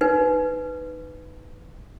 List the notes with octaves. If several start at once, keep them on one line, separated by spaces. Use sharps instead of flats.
D#4 B4